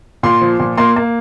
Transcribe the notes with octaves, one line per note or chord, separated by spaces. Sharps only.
A#2 C6
F3
A#2
A#3 C6
A#3